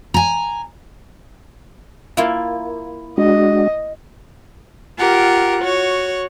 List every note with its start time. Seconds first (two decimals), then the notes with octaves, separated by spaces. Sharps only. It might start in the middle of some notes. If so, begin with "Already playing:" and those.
0.14 G#5 A#5
2.17 A#3 E4 F4
3.18 G#3 D4 F#4 D#5
4.98 F4 G4 A#4 F#5
5.61 F#4 C#5